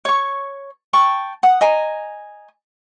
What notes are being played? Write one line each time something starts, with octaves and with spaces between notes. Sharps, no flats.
C#5 C#6
G5 A5 C#6
F#5 D#6
D#5 G#5 A#5